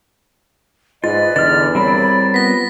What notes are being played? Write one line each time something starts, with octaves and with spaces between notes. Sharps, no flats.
G#2 F4 B4 D5 D#5 A6
E2 D3 F6 A6
G3 C4 A#4 C#5 B5
B3 F4 A#6 B6